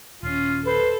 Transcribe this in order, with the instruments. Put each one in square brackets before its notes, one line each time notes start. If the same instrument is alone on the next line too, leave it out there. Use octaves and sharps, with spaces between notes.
[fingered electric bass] D#1 [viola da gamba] C#4 [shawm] F4
[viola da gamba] A4 [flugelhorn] B4 [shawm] C5